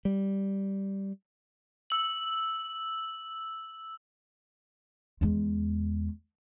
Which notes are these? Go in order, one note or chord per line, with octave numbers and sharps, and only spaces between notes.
G3
E6 F#7
E2 G#3